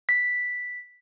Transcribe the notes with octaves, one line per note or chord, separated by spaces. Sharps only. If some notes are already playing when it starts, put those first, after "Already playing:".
B6